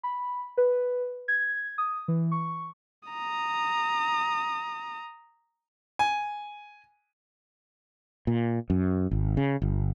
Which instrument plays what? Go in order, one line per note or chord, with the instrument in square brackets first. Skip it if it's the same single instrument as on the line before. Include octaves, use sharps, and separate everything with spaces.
[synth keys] B5
B4
G#6
D#6
E3
C#6
[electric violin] A#5 D#6
[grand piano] G#5
[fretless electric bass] A#2
F#2
G#1
C#3
G1